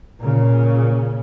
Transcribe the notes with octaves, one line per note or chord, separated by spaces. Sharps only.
A#2 C#3